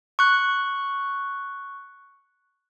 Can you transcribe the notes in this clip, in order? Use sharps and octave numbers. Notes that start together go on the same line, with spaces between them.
C#6 F#6